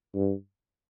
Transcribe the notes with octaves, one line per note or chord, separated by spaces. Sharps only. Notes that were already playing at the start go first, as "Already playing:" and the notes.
G2